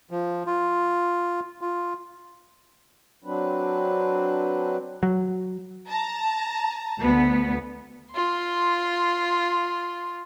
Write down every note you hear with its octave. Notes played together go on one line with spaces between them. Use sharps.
F3
F4
F4
F#3 C4 D4 B4
F#3
A5 A#5
D2 B3
F4 C6